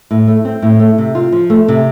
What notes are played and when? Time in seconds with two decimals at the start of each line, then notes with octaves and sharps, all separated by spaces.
0.11 A2
0.27 A3
0.45 C4
0.62 A2
0.80 A3
0.98 C3
1.15 F4
1.32 F3
1.50 A3
1.68 C3